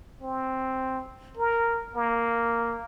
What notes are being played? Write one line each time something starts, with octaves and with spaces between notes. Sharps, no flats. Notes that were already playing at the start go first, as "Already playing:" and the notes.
C4
A#4
A#3